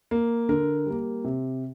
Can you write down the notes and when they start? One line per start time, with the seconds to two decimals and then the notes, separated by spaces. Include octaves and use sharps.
0.11 A#3
0.49 D3 A#4
0.86 G3 A#3
1.24 C3